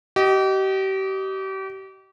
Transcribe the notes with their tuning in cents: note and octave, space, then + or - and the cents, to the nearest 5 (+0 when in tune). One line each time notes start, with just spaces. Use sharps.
G4 -35 D#5 +0